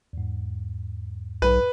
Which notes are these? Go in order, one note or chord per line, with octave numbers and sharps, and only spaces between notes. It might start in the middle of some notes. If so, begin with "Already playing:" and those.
E2 G#2
B1 B4